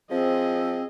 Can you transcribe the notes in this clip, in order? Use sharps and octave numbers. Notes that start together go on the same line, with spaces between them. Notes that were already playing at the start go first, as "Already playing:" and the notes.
F3 C4 G#4 D#5